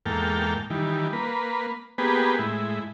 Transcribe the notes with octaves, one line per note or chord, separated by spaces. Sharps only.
E2 G#2 A#3 A4 G5 F6
D#3 E3 G3
A#3 B4
A#3 B3 G4 G#4 B4
A2 G#3 E4